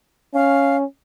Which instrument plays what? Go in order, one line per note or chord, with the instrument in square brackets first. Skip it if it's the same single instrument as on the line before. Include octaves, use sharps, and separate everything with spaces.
[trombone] C#4 [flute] F5